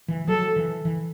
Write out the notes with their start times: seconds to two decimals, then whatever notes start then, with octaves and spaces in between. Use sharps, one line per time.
0.08 E3
0.28 F#3 A4
0.56 E3
0.85 E3